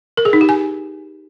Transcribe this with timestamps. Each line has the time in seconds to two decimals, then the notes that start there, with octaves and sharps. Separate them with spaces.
0.17 A#4
0.25 G#4
0.33 D#4
0.41 G4
0.49 G#5